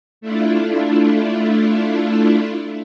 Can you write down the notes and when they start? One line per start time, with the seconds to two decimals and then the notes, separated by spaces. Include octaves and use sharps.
0.21 A3 D4 E4 F4